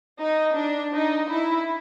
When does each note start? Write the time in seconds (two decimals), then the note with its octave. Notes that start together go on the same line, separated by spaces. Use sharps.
0.21 D#4
0.57 D4
0.94 D#4
1.30 E4